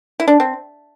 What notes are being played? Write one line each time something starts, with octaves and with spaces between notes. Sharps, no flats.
E4
D4
C4